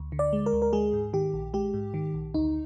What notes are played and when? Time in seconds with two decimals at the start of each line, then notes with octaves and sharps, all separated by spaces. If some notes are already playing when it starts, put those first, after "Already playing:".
Already playing: D2
0.12 D3
0.19 D5
0.33 G#3
0.46 A#4
0.53 D2
0.62 A#4
0.73 G#3 G#4
0.93 G#2
1.13 D#3 G4
1.34 A#1
1.54 G#3 G4
1.74 G#2
1.94 D#3
2.14 A#1
2.34 D2 D#4